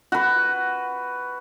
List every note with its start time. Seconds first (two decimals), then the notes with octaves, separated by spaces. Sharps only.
0.12 F#4 B4